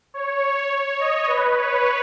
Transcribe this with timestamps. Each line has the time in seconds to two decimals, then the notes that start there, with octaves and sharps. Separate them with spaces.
0.14 C#5
0.71 C#5
0.99 D#5
1.27 B4
1.56 C#5